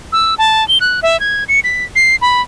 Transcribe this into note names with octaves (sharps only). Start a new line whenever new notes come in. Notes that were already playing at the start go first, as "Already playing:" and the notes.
E6
A5
G7
F#6
E5
G#6
C#7
B6
C7
B5